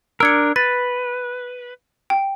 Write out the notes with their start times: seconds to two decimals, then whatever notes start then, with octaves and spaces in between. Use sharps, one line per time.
0.20 D4 A#4 E6 G#6 C#7
0.56 B4 A6
2.10 G5